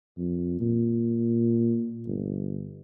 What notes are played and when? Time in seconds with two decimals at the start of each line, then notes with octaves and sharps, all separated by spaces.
0.18 F2
0.60 A#2
2.07 G1